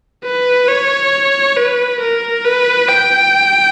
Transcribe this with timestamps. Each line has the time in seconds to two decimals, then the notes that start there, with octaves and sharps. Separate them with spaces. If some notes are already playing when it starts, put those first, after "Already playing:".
0.25 B4
0.69 C#5
1.57 B4
2.00 A#4
2.45 B4
2.88 G5